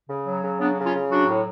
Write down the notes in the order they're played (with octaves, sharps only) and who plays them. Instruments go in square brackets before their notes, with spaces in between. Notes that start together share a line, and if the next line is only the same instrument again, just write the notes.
[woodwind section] C#3
F#3
C#3
F#3 B3 D4
C#3
C#4 F4
C#3
F#3 D4 F#4
A2